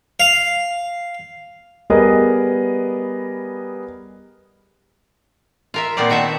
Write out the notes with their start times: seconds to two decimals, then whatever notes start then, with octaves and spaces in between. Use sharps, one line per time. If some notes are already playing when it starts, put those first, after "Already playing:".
0.20 F5
1.90 G3 B3 G#4 A#4 B4 D#5
5.74 F4 A#4 E5
5.97 A#2 B3 C4 F4 D5
6.10 D#3 F#4 E5 A5